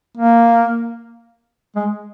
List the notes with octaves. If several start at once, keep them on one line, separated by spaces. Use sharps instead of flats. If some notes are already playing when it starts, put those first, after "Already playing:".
A#3
G#3